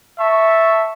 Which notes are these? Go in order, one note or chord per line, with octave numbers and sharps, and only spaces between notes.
E5 A5 C#6